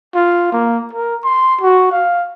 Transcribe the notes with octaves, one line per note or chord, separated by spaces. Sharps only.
F4
A#3
A#4
C6
F#4
F5